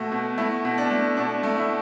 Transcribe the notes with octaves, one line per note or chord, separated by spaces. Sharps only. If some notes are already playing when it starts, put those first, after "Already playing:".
Already playing: B2 A3 F#4
B2
A3 E4
B2
D4
A3
B2 D4
A3
E4